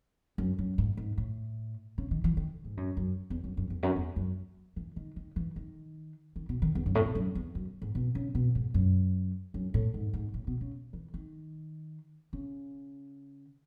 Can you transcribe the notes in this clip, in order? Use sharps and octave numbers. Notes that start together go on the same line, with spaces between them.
F#2
F#2
G#2
G#2
A2
C#3
D#3
E3
D#3
G#2
F#2
F#2
E2
F#2
F#2
E2
F#2
E2
F#2
E3
D#3
D#3
E3
D#3
D#3
B2
D#3
E2
F#2
A2
B2
F#2
E2
F#2
G#2
B2
C#3
B2
G#2
F#2
F#2
A2
G#2
G#2
A2
B2
C#3
E3
D#3
C#3